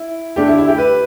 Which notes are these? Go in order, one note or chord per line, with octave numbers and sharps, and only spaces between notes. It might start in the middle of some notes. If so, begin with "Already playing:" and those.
Already playing: E4
D3 A3 D4 G4
E4
E4
G4
B4